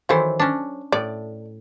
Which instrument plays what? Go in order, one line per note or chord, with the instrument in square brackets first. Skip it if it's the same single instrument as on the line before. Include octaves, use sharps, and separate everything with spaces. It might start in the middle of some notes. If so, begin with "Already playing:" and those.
[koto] D#3 E3 [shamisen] F#3 A4 C5
[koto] C#4 D4
[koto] A2 [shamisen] D5